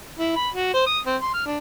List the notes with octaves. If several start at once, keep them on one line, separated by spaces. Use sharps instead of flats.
E4
B5
F#4
C5
D#6
C4
C6
F6
D4